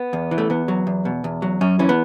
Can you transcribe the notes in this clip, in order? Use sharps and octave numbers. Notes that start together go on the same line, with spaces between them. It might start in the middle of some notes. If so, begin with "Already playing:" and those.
Already playing: B3
E2
E3
A3
E2 B3
F#3
E2
B2
E2
F#3
F#2 C#4
E3 C#4
B3